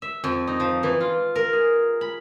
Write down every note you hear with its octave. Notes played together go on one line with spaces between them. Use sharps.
E5
F2
D#4
F3
E3
F4
A#4
G#4
B5